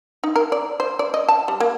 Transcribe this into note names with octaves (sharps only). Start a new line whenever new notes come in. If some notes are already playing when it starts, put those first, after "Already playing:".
D#4
A#4
D5
C5
D5
D#5
A5
G3
A#3